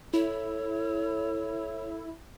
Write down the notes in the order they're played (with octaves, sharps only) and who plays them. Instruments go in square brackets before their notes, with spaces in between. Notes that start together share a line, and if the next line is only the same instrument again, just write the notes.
[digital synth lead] E4 [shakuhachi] A4 [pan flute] C#5